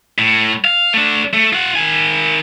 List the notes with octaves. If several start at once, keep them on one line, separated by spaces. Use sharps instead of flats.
A2
F5
A3 D4
A3
F4 F#5
D#3 G#5